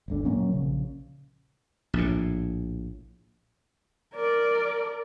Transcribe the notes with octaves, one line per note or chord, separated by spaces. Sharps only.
G1 D2 D3
A#2 F#3 A#3 C#4
A#1 C#3
A#1 A2
A#4 D5